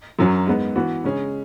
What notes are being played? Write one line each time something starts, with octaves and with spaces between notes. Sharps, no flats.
F#2 F#3 C#4
G#2 G#3 B3
E3 B3 F#4
C#3 G#3 C#4 G#4